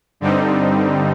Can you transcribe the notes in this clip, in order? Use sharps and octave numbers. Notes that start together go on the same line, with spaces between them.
G2 D3 G3 C4 D#4